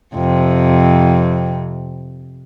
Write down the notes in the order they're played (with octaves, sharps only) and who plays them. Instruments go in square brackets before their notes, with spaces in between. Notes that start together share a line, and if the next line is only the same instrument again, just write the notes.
[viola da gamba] F2 C3